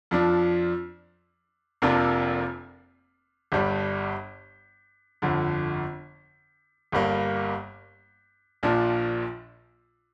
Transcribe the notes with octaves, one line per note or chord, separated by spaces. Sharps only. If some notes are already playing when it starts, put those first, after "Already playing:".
F2 F3 D4
F1 F2 C3 A#3 D4
G1 G2 G3 D4
G1 F2 D3
G1 G2 G3 A#3
A#1 A#2 F3 D4